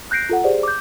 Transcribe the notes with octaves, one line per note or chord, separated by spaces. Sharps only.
F#6 G6 A#6 C7 D7
F4 A4 F#5
G4 G#4 C5 D5
D6 G6